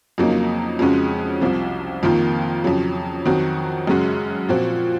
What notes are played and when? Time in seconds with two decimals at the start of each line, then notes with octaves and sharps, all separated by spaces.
0.18 F2 C#3 F#3 A#3 D#4
0.79 F2 C#3 G#3 C#4 F#4
1.41 C2 C3 F3
2.03 F2 D#3 A#3 F4
2.64 F2 C#3 F#3
3.25 F2 D#3 F#3 C4 F#4
3.87 F#2 C#3 G#3 C#4 F#4
4.49 A#2 F3 C4 F#4